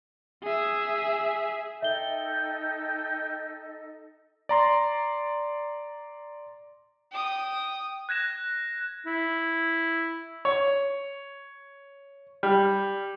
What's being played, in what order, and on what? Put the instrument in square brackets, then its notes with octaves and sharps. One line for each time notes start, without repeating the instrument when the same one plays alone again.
[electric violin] G#4 E5
[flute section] D#4 A4 D#5 [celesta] E5 G7 [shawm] G5
[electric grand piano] D5 A#5 C6
[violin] G5 D#6
[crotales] F#6 G#6 A#6 E7
[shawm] E4
[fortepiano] C#5
G3